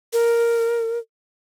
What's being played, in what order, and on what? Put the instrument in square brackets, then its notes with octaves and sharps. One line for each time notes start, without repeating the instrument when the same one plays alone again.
[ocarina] A#4